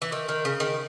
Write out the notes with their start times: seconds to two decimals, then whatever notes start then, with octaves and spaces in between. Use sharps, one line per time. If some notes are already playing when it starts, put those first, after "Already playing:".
0.02 E3
0.12 D#3
0.29 D#3
0.45 C#3
0.60 D#3